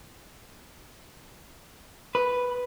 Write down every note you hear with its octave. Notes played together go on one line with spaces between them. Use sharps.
B4